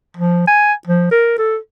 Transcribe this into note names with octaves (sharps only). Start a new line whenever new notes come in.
F3
G#5
F3
A#4
A4